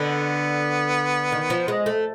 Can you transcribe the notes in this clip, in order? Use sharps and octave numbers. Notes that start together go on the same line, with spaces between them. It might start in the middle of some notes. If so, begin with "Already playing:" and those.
Already playing: D3 B3
D#3
F3
G#3
A3